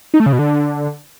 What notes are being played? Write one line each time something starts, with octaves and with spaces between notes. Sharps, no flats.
D#4
A3
C#3
B2
D3